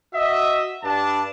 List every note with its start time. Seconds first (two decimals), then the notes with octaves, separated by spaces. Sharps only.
0.13 F#4 D#5 E5
0.84 G2 D4 A5